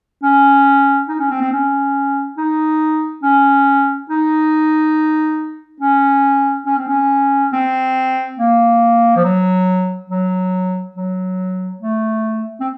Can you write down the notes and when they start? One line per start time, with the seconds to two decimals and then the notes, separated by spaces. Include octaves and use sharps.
0.23 C#4
1.09 D#4
1.20 C#4
1.31 C4
1.41 C4
1.53 C#4
2.37 D#4
3.23 C#4
4.10 D#4
5.80 C#4
6.66 C#4
6.78 C4
6.88 C#4
7.53 C4
8.38 A#3
9.16 F3
9.24 F#3
10.10 F#3
10.96 F#3
11.81 A3
12.60 C4